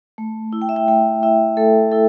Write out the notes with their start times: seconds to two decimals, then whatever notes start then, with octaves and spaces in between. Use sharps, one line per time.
0.18 A3
0.53 E4
0.62 G5
0.69 E5
0.76 G5
0.88 A3 G5
1.23 E4 E5
1.57 A3 A4
1.92 E4 A4